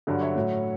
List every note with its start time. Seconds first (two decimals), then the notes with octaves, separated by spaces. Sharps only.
0.07 G2 D3 F#3
0.21 C#5 E5
0.35 A2 F#3